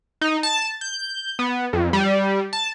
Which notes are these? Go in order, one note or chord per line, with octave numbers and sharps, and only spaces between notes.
D#4
A5
G6
B3
F2
G3
A5